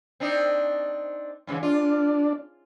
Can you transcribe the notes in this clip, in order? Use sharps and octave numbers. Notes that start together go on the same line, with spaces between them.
C4 D4 D#4
G#2 C#3 E3
D4 F4